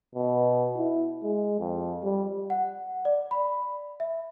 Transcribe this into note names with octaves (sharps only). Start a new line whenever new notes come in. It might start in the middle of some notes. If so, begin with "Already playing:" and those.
B2
E4
G#3
F2
G3
F#5
D5
B5
E5